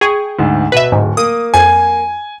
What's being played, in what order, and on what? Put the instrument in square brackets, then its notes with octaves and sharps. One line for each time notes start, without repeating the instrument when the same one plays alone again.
[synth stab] G#4 [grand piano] G5 C#6
[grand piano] D2 G#2
[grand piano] B2 [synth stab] B4 E5
[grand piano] D1 [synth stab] G#2
[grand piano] A#3 [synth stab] D#6
[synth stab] F2 G#6 [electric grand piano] G#5